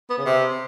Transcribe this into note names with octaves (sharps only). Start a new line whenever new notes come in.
B3
C#3
C3